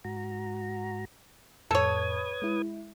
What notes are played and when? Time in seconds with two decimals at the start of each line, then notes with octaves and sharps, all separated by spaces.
0.04 G#2 F#4 A#5
1.71 F2 A2 A4 B4 C#5 D#6 G#6
2.42 G#3 E4